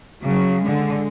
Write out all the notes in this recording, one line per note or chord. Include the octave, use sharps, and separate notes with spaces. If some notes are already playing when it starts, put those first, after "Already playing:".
C#3 F#3
D3 G#3